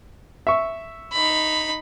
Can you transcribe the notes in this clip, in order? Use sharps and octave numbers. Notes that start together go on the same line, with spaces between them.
E5 C#6
D#4 B5